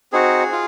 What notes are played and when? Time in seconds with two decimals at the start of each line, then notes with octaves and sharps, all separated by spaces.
0.12 C4 D#4 F#4 G#4
0.52 F4